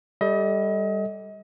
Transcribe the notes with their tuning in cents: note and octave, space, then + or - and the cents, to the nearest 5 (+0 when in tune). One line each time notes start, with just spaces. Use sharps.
G3 +10 A4 +0 D#5 +35